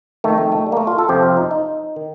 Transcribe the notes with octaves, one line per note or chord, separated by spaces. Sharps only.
F2 D#3 A3
A3
A3
G3
A#3
A3
F4
A4
F2 C3 F3 G4
F4
D#4
D#4
D#3